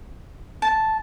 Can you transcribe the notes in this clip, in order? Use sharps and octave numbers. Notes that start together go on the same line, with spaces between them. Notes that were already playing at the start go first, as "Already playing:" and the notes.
A5